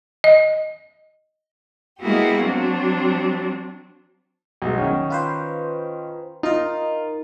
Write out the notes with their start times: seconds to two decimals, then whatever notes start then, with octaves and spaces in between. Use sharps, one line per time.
0.24 D#5
1.99 G#3 A#3 B3 E4 F#4 G4
2.43 F#3 C4 D4
4.62 B1 G#3
4.78 D#3 C#4
5.10 F4 B4 C5
6.43 D#4 F4 A#4